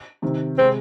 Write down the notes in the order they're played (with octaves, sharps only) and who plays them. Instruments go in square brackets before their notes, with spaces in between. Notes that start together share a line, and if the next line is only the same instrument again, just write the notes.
[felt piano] C3 D#3 C4
[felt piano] C3 G#3 [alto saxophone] C4